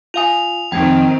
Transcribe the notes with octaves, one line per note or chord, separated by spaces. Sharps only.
F4 F5 G#5 D#6 F7
F2 D#3 C4 G5 G#6